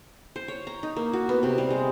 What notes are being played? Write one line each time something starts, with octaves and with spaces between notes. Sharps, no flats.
C5
C#5
A#5
D#4
A#3
F#4
B3
C3
G3
G#3